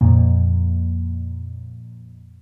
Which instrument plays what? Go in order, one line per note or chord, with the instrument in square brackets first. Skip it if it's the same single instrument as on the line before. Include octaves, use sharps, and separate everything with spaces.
[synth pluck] F2 A#2